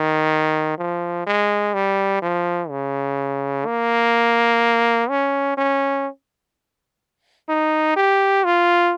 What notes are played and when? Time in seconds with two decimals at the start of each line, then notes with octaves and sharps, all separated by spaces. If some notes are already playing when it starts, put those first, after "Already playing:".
Already playing: D#3
0.78 F3
1.27 G#3
1.74 G3
2.22 F3
2.70 C#3
3.66 A#3
5.10 C#4
5.57 C#4
7.49 D#4
7.96 G4
8.45 F4